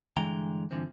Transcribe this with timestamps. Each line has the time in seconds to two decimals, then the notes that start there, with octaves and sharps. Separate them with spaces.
0.17 G2 D3 E3 G#3 G5 A#5
0.71 G2 D3 E3 F3 C4